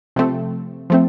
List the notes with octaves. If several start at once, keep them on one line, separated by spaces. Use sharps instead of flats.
C3 F3 A3 C4
F3 A3 C4